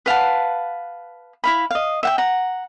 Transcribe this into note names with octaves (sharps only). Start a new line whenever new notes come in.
B4 F5 F#5 A5
E4 F5 B5
D#5 F5
E5 F#5 G5
F#5 A#5